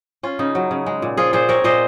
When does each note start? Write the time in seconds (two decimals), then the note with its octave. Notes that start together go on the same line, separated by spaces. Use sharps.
0.23 C#4 F4
0.39 C#3 D#4
0.55 F#3
0.71 C#3
0.86 G#3
1.02 A#2
1.17 F3 F4 G#4
1.33 A#2 G#4 C5
1.49 C4 A#4 C#5
1.64 A#2 C5 D#5